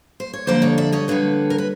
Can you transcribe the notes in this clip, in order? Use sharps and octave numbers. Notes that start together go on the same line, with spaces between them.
C5
C#5
F2 D3 G3 A#3 C5 D5
C#5 D#5
D5 E5
C#5 D#5
F2 D3 G3 A#3 B4 C#5
A#4
B4